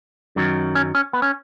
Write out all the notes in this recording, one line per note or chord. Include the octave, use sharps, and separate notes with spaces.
F#2 D#3 F#3
C#4
C#4
B3
C#4